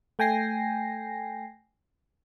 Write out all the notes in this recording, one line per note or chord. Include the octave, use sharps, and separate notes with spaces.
A3 G5 G#5 A#6 C7